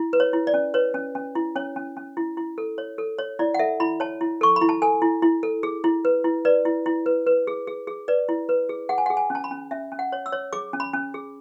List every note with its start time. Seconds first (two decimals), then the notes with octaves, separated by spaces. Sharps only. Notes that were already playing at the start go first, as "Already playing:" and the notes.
Already playing: E4
0.13 B4
0.20 C#5
0.33 E4
0.47 D5
0.54 C#4
0.74 B4 C#5
0.94 C#4
1.15 C#4
1.35 E4
1.56 C#4 C#5
1.76 C#4
1.97 C#4
2.17 E4
2.37 E4
2.58 A4
2.78 C#5
2.98 A4
3.18 C#5
3.39 E4 D5
3.54 F#5
3.59 A4 E5
3.80 E4 B5
4.00 C#5 A5
4.21 E4
4.41 A4 C#6
4.56 B5
4.61 E4
4.69 A5
4.82 A4 G#5
5.02 E4
5.22 E4
5.43 A4
5.63 G#4
5.84 E4
6.05 B4
6.24 E4
6.45 B4 D5
6.65 E4
6.86 E4
7.06 B4
7.27 B4
7.47 G#4
7.67 G#4
7.87 G#4
8.08 B4 D5
8.29 E4
8.49 B4
8.69 G#4
8.89 G#4 F#5
8.98 G#5
9.06 G#4 F#5
9.17 G#5
9.30 C#4 A5
9.44 B5
9.51 C#4
9.71 C#4 E5
9.92 C#4
9.99 F#5
10.12 C#5
10.26 E6
10.32 C#5
10.53 G#4 D6
10.73 C#4
10.80 B5
10.94 C#4
11.14 G#4